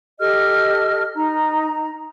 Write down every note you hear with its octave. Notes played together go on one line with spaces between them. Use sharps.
G4 A4 D#5 F6
D#4 A#5